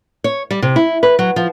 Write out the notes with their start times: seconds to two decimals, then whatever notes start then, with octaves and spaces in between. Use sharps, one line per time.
0.24 C#5
0.51 G3
0.62 C3
0.76 E4
1.03 B4
1.19 F#3
1.36 F3